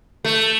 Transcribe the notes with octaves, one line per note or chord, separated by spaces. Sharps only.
A3